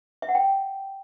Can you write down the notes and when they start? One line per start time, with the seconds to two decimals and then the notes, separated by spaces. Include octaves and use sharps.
0.22 E5
0.29 F#5
0.35 G5